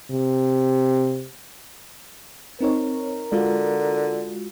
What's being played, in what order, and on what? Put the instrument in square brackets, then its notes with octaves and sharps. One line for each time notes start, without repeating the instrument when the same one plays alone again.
[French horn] C3
[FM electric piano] C4 D#4 C#5 [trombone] A#4
[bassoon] D3 [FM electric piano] G#3 F4 F#4